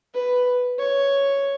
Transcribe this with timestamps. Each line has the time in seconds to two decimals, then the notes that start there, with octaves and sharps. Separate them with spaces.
0.14 B4
0.79 C#5